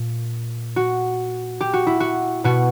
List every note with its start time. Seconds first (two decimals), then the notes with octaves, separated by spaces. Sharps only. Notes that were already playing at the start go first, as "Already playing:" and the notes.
Already playing: A#2
0.76 F#4
1.61 G4
1.74 F#4
1.87 E4
2.00 F#4
2.44 B2 F#4